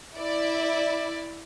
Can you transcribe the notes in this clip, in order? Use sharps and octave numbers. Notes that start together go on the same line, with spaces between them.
E4 D5